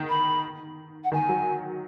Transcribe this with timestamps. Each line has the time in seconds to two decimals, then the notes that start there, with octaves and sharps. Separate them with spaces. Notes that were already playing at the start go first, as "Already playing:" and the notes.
Already playing: D#3
0.09 B5
1.04 F#5
1.12 D#3 G#5
1.29 F#3